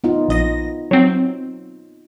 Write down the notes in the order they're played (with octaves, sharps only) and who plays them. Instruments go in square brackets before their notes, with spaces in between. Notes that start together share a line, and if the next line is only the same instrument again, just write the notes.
[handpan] B3 D#4 F4
[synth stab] A#1 D#5 A#6
F#3 C4